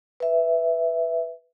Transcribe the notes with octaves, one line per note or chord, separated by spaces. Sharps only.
B4 E5